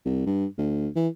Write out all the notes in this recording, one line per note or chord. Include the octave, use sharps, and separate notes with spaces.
C2
G2
D2
E3